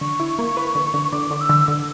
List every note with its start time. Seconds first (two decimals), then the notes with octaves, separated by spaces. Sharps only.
0.01 D3 C#6
0.20 E4
0.39 A#3
0.57 B4
0.75 D3
0.94 D3
1.12 D3 D6
1.31 D3
1.41 E6
1.49 D3
1.68 D3